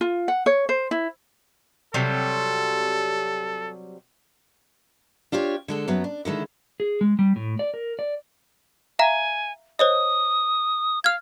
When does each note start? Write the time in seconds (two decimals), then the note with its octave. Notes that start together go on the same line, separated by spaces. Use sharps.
0.01 F4
0.28 F#5
0.46 C#5
0.69 C5
0.91 E4
1.94 C3 F#3 G3 A4
5.32 D4 F4 G4 C#5
5.68 D3 G#3 A4
5.88 F#2 F#3 B3
6.04 D4
6.25 D3 D#3 G#3 E4
6.80 G#4
7.01 G#3
7.19 G3
7.36 A2
7.59 D5
7.74 A#4
7.99 D5
8.99 E5 F5 G#5 A#5
9.79 C5 C#5 D#5 D#6
11.04 F5 F6 G#6